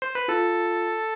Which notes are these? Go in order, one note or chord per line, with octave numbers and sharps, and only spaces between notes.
C5
B4
F4 A4